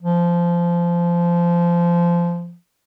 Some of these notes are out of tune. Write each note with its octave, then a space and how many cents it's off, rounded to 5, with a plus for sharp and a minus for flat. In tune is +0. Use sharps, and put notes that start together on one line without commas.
F3 -20